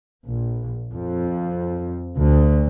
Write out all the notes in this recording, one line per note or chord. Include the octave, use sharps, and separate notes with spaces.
A#1
F2
D2